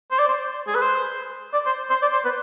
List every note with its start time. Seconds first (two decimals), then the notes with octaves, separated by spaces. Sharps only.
0.11 C5
0.19 D5
0.28 C5
0.67 G#4
0.75 B4
0.82 C5
1.53 D5
1.66 C5
1.90 C5
2.02 D5
2.13 C5
2.25 B4